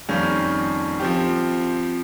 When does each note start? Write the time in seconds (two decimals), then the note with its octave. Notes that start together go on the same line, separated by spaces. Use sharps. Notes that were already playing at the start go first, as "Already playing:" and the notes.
0.09 F2 D#3 G3 A#3 C#4
1.00 F3 C4 G4